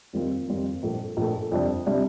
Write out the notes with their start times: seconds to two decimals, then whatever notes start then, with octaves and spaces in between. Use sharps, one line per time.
0.13 F2 D#3 G3 C4 F4
0.48 F2 D#3 G3 C4 F4
0.83 A#1 A#2 A3
1.17 A#1 A#2 A3
1.52 F2 C3 G3 D4
1.87 C3 G3 D4